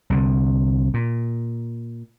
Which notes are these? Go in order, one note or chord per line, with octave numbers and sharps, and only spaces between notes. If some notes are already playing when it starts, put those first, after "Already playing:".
C2 D3
A#2